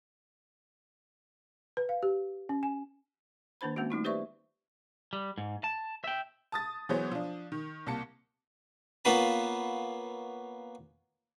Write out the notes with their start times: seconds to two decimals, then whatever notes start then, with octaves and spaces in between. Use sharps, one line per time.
1.77 B4
1.89 F5
2.03 G4
2.49 C#4
2.63 G#5
3.61 D#3 A#3 D4 C5 B5
3.76 G#3 A#3 C4 C#4 F#4
3.90 G3 A3 D#4 F4
4.04 G4 B4 C5 D5 E5 C#6
5.13 G3
5.38 G#2
5.64 A5
6.04 E5 G5
6.52 A5 D#6 A6
6.89 E3 F#3 G#3 B3 C5 C#5
7.12 F3 D4
7.52 D#3
7.86 C2 A#3 A5 C#7
9.05 A#3 B3 C#4 F4 B4 A5